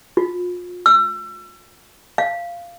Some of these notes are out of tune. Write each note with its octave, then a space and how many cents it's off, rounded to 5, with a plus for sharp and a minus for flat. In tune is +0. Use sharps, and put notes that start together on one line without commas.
F4 +30
E6 +35
F5 -15